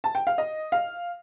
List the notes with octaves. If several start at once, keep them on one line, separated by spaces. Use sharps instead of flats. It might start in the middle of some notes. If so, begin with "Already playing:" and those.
A5
G5
F5
D#5
F5